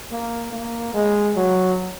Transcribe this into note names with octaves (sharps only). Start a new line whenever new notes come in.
A#3
A#3
G#3
F#3